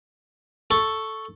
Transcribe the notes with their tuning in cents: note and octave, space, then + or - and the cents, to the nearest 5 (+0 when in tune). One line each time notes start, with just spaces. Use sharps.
A4 +0 C#6 +0